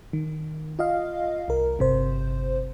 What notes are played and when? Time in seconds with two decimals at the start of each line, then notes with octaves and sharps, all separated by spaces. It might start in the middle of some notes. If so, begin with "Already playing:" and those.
0.13 D#3
0.79 F4 D#5 F5
1.48 C2 A#4
1.79 G1 C3 C5